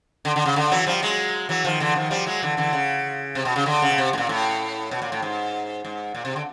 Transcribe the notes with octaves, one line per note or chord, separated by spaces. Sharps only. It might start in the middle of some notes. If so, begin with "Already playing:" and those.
D3
D3
C#3
D3
E3 F#3
F3 G3
F#3 G#3
E3 F#3
D#3 F3
D3 E3
D#3 F3
F3 G3
F#3 G#3
D3 E3
D3 E3
C#3
C3
B2
C#3
D3
C#3
B2
C3
A2
A#2
A2
B2
A#2
A2
G#2
G#2
A#2
C3
D3